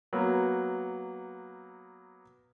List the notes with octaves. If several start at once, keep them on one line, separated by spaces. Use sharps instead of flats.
F#3 A#3 B3